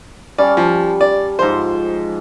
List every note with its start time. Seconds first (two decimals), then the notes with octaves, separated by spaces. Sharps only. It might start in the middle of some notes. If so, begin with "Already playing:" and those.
0.38 G3 C#4 D5 A5
0.57 F3
1.01 D5
1.39 G#2 F3 C5